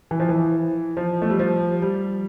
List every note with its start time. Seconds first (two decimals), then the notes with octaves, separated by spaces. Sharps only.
0.11 E3
0.20 F3
0.29 E3
0.97 F3
1.22 A3
1.30 G3
1.39 F3
1.82 G3